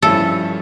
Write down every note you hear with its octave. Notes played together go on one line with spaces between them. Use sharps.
G2 F3 C#4 E4 A4